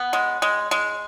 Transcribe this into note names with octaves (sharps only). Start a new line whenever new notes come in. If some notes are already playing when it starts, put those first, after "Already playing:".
Already playing: B3
G#3
G#3
G#3